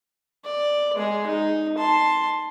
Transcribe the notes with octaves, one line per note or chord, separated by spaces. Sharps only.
D5
G#3 G#4
D#4
A5 C6